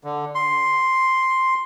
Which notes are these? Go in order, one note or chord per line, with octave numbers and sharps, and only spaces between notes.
D3
C6